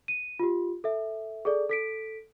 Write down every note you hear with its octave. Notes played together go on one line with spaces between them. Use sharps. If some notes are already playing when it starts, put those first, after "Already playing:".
D#7
F4 G4
A4 E5
G#4 A4 D5
A4 B6 D7